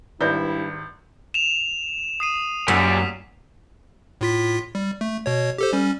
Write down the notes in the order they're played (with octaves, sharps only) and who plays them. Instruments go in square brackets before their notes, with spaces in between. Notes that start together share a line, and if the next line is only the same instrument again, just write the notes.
[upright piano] G#1 G6 [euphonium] G2 [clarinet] E4 [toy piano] B4 D5 E5
[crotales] E7 F7
D#6 C7 D#7
[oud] F#2 [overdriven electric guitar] A#2 G3 [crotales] B6
[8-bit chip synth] A2 F4 B6
G3
A3
B2 C#5
G4 A4 C5
G3 C#4